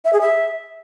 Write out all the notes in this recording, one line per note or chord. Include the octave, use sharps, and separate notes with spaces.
E5
G#4
E5